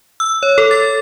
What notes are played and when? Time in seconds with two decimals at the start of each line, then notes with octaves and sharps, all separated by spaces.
0.20 E6
0.43 C#5
0.58 A4
0.71 A6